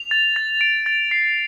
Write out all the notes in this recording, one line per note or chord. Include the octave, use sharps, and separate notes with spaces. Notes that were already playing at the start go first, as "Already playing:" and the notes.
Already playing: F7
A6
A6
D7
A6
C7